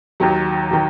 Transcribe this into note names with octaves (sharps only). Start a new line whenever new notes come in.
D#2 D#3 F#3
D#3 F#3